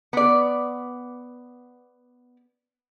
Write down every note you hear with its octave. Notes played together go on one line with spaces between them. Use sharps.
B3 D5